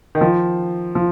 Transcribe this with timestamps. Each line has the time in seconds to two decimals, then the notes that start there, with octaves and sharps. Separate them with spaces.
0.15 D#3
0.21 F3
0.95 F3